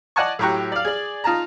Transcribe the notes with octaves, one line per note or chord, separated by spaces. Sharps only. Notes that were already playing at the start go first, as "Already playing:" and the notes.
D5 D#5 F#5 G#5 A5 C#6
A2 F#3 G4 A#5 C#6 F#6
D5 F5
G#4 D5
D#4 F4 A5 A#5